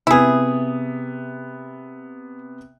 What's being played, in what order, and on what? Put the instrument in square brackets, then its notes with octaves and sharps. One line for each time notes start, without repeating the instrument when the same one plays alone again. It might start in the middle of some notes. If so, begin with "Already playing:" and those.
[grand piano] C3 B3 [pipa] E4 G#4